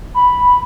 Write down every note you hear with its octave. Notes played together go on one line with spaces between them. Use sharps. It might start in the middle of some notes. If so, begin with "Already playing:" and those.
B5